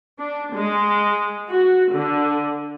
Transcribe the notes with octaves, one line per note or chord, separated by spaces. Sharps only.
D4
G#3
F#4
D3